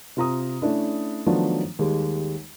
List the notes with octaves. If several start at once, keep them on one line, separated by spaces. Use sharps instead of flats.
C3 F4 A#5 D#6
A3 C#4 D4 E4
D#3 F3 F#3 A3 B3 D4
D#2 G3 G#3